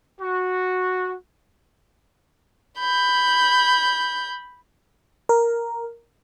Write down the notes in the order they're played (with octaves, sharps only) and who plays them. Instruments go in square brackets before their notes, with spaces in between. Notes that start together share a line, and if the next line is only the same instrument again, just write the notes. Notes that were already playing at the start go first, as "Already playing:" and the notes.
[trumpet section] F#4
[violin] B5 G6
[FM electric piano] A#4